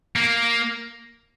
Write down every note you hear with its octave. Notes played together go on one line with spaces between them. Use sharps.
A#3